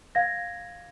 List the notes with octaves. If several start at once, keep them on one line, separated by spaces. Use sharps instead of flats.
F5 G#6 A#6